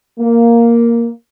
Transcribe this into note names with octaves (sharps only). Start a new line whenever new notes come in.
A#3